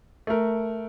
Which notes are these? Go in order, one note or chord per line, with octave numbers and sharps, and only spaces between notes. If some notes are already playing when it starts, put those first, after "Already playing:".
A3 A#4